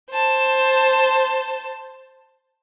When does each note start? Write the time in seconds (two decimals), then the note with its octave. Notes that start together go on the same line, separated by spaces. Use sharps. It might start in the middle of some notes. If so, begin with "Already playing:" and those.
0.10 C5 A5